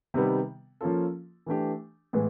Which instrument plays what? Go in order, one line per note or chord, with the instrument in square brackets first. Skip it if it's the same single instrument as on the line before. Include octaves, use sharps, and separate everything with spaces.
[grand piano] C3 D#3 G3 B3
F3 A#3 C#4 F4 A4
E3 A3 D4 G4
A2 E3 G#3 B3